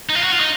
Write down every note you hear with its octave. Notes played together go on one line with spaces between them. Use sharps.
D#4
F4
F#4
F4
D#4